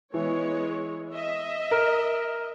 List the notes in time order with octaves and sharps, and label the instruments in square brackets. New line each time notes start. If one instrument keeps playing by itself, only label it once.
[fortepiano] E3 [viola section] G#3 B3 C#5
[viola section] D#5 E5
[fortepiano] A#4